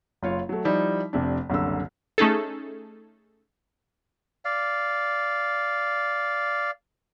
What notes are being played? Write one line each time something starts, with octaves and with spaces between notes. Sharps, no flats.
F#1 F4 C#5
F#3 A3
F3 G3 D#4 E4
F1 C3 D4
F#1 C2 D3 E6
A3 C#4 D#4 G#4 A4
D5 F5